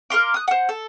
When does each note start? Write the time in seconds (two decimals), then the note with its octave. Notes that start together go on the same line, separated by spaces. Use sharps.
0.10 A#4 F5 C6 D6
0.34 D#6 F#6
0.48 C5 F#5
0.69 A4